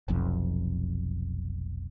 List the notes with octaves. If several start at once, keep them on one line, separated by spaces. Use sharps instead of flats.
F1 B1 F2